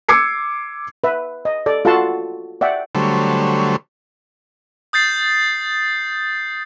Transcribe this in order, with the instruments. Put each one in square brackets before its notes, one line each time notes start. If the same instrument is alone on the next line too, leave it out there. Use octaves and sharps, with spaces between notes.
[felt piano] D6 E6 G#6 C7 C#7
[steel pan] B4 E5
D#5
A4 D5
F4 F#4 A4 F#5 A5 C6
D5 E5 F#5 G5
[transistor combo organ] D3 F#3 G3 A3 C5 C#5
[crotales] D#6 G6 A6 C7